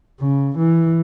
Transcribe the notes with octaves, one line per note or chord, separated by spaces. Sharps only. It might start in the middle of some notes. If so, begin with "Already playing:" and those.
C#3
E3